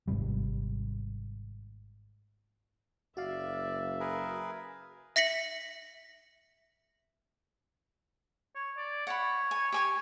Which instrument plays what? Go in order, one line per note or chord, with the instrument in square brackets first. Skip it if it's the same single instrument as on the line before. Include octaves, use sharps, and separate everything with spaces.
[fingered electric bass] G#1 G#2 C3 G3
[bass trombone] F#1 [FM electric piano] F#4 F5 [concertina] D5 [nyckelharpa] E5
[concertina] G#4 A#4 B4
[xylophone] E5 A#6 B6 C#7 F#7
[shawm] C#5
D5
[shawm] C#5 [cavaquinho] F#5 B5
[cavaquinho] G#5
G4 G#5 C#6